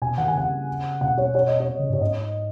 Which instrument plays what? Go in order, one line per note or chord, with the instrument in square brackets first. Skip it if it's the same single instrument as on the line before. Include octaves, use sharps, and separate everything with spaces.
[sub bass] B2 [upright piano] G#5
[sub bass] D#3 [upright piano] F#5
[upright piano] G#5
[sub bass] C#3 [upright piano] F#5
[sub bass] B2 [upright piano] F#5
[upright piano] C#5
C#5
D#5
C#5
[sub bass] C#3
G#2
[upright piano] C#5
[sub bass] G#2 [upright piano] D#5